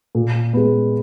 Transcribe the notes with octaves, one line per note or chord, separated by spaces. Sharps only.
A#2
G#3 B3